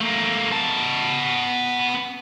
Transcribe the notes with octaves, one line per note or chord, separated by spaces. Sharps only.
A3 A#3
B3 A5